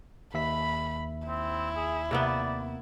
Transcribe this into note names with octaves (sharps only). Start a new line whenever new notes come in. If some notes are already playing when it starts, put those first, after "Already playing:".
D#2 E5 B5 B6
C4 E4
G#4
C3 A#3 B3 D5